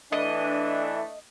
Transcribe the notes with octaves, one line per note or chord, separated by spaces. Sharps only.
E3 A3 D4 D#5